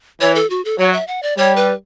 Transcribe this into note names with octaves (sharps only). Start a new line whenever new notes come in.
E3 C#5
A4
F#4
A4
F#3 C#5
E5
F#5
D5
G3 C#5
B4